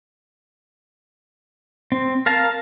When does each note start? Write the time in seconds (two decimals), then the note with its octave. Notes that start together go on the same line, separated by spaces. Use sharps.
1.92 C4
2.26 A#4 F5 A5